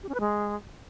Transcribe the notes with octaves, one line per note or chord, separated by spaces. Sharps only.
G4
C#4
B4
G#3